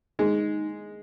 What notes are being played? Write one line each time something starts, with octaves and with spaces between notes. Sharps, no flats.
G#3 D#4